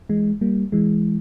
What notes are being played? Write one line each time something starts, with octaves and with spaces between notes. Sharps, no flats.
E3 G#3
G3 A#3
E3 G#3